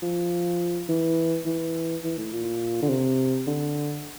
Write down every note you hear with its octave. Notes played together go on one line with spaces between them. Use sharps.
F3
E3
E3
E3
A2
A#2
D3
C3
D3